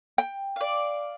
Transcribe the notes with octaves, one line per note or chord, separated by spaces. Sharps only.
G5
D5 F5